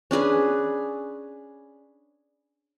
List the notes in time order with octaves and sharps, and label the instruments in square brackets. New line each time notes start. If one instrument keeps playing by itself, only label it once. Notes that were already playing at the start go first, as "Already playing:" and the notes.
[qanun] C#4 D4 G#4 B4